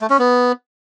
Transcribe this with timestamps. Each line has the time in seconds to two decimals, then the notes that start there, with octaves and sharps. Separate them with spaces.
0.01 A3
0.10 C#4
0.19 B3